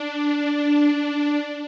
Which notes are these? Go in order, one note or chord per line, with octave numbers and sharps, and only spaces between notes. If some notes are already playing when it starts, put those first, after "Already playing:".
Already playing: D4